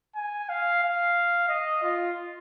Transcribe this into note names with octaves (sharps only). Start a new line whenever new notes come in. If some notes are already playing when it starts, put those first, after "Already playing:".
G#5
F5
F5
D#5
F4